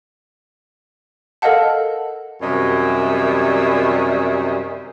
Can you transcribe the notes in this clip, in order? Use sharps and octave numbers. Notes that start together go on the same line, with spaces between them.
A4 A#4 D#5 F5 F#5 A5
F#2 C3 D#3 G3 D#5 E5